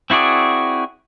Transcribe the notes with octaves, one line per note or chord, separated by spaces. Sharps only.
C4 E4 F#4 G#4 D5